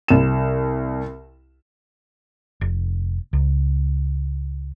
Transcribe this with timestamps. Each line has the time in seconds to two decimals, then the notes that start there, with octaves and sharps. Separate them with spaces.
0.08 C2 E7
2.61 F1
3.33 C#2